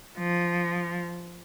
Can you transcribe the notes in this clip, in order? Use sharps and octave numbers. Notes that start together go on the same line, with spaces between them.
F3